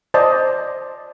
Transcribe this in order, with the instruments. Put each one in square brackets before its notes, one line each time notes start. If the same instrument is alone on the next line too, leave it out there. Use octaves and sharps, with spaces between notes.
[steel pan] C5 D5 D#5 A5